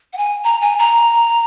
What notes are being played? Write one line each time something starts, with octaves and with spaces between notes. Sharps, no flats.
F#5
G#5
A#5
G#5
A#5